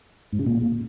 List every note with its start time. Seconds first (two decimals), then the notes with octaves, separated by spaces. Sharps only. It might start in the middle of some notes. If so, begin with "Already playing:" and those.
0.33 G#2
0.39 C#3
0.46 A#2